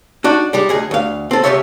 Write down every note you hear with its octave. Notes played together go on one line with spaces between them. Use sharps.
D4 D#4 F#4
G3 G#3 G4
D2 G#4 D#5
D2 F5
C4 A4
C#2 C3 F4 G4 C#5 E5